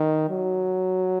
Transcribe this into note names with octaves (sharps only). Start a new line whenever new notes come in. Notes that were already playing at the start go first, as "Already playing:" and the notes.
Already playing: D#3
F#3